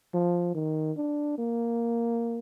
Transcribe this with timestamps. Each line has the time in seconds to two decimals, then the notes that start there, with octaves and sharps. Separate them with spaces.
0.14 F3
0.55 D#3
0.97 D4
1.38 A#3